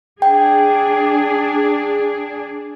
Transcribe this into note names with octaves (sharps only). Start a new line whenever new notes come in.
D4 G#4 G5